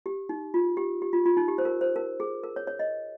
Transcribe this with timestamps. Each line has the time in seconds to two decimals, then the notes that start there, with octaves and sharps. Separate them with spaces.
0.06 G4
0.29 D#4
0.54 F4
0.77 G4
1.02 G4
1.13 F4
1.26 F4
1.37 D#4
1.48 G4
1.58 C5
1.65 A#4
1.81 C5
1.96 A#4
2.20 G#4
2.44 A#4
2.56 C#5
2.67 C#5
2.79 D#5